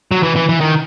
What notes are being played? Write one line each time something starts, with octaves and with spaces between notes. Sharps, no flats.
F#3
E3
E3
E3
D#3